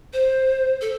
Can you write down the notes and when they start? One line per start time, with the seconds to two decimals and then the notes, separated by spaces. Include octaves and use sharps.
0.13 C5
0.81 A4